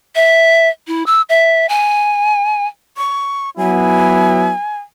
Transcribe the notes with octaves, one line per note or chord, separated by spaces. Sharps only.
E5
E4
E6
E5
G#5
C#6
F#3 B3 E4 G#5